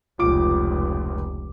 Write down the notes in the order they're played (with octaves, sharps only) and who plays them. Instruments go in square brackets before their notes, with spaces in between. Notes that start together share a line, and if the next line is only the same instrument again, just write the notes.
[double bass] F1 C#2 [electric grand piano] F4 D6 D7